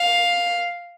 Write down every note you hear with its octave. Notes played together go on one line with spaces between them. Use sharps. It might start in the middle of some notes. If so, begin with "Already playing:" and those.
Already playing: F5